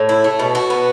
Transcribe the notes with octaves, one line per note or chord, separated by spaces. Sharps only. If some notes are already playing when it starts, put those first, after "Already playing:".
Already playing: A2
E4
A3
B2
F#4
B3